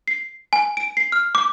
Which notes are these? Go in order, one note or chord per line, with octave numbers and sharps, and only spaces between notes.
C7
G#5
D7
C7
F6
D6